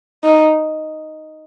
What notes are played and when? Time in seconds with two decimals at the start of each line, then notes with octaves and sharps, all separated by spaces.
0.24 D#4